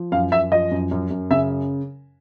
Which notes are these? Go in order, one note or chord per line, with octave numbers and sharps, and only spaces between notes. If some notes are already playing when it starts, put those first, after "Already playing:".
Already playing: F3
F#2 F5
F#2 E5
F3 D#5
F#2
F#2
F#2
C#3 E5